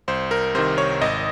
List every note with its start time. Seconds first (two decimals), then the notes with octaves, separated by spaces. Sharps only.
0.08 C2 C5
0.31 A#4
0.55 C3 D#3 C5
0.78 C#5
1.01 G#1 D#5